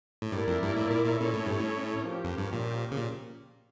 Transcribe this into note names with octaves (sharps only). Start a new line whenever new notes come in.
A2
G2 A#3 E4 A#4 D5
F2
G2
A2
A#2
A#2
A#2 C#4 E4 A4 C#5
A2
G2
A2
F3 C#4 G4 A#4
F2
G2
A#2
C#3
A#2